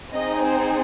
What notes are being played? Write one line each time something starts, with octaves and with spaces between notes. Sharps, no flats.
C4 D#4 G#4 D#5
C5